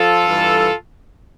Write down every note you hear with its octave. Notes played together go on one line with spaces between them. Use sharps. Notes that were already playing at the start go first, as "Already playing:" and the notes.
Already playing: F3 F4 A4
G2 E3 G3